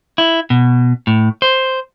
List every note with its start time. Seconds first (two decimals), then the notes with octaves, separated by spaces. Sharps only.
0.18 E4
0.50 B2
1.07 A2
1.42 C5